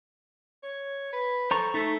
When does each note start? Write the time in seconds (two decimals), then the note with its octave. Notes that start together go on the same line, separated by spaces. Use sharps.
0.63 C#5
1.13 B4
1.51 A4 C5 A#5 C#6
1.74 A3 D#4 A4